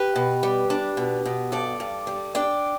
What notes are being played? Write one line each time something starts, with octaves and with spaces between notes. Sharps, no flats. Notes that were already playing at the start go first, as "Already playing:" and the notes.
Already playing: G4 B4
B2
G3
D4
B2
B2
G2 A4 D5
G2
G3
D4 D5 G5